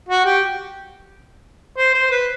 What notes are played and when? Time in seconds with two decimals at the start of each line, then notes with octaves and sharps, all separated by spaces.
0.08 F#4
0.25 G4
1.77 C5
1.94 C5
2.11 B4